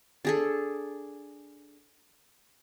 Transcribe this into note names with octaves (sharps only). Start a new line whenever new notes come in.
D4 G#4 A4